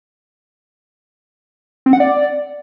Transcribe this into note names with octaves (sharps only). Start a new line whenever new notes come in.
C4
F#5
D5